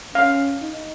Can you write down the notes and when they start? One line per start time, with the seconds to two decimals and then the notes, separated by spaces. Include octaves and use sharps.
0.15 C#4 F5
0.62 D#4